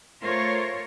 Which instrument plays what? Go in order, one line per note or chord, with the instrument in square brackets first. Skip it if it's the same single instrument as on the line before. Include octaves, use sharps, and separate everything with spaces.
[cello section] A3 F4 A#4 C5 C#5